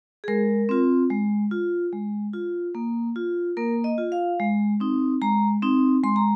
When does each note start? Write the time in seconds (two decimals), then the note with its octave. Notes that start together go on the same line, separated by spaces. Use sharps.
0.24 G#4
0.28 G#3 A#4
0.69 C4 F4
1.10 G#3
1.51 F4
1.93 G#3
2.33 F4
2.75 A#3
3.16 F4
3.57 A#3 A#4
3.84 D#5
3.98 F4
4.12 F5
4.40 G#3
4.80 C4 D#4
5.22 G#3 A#5
5.62 C4 D#4
6.04 G#3 C6
6.16 A#5